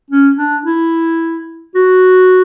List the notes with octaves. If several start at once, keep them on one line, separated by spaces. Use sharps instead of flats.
C#4
D4
E4
F#4